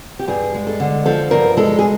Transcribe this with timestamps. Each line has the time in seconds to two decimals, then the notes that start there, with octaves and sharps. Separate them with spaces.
0.19 G4
0.28 G2 G#4
0.54 G#3
0.67 A4
0.80 D3
1.06 F3 A4
1.31 G2 A#4
1.57 G#3 A4
1.79 G#4